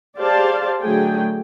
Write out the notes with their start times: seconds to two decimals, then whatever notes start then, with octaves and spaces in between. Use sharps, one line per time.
0.17 G4 G#4 C5 D5 F5 A5
0.82 D3 F#3 A3 G#4 G5